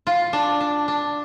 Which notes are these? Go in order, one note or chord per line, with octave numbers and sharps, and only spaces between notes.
F4
D4
D4
D4